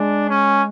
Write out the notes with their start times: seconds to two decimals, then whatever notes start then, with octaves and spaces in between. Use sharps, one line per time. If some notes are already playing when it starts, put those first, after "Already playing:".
Already playing: G#3 D4
0.29 C#4